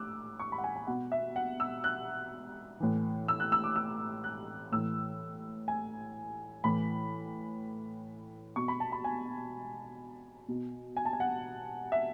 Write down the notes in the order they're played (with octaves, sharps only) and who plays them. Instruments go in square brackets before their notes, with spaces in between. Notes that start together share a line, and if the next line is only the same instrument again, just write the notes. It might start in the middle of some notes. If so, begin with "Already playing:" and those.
Already playing: [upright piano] A2 D6 E6 F#6
C#6
B5
F#5
G#5
G#5
B2 F#5
E5
F#5
E6
F#6
A2 E3
E6
F#6
E6
D6
E6
F#6
A2 E3 E6
G#5
A2 E3 B5
B2 C#6
B5
A5
B5
G#5
B2
G#5
A5
G#5
F#5
E5